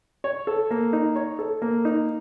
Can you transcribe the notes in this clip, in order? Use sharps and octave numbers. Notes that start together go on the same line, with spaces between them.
C#5
A4
A#3
D#4
C#5
A4
A#3
D#4